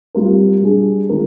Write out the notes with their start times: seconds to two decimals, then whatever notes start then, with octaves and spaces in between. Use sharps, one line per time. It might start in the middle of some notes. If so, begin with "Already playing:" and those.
0.15 G3 C4 F4 A#4
0.61 G3 D4 G#4
1.09 D#3 G#3 C4 F4 A#4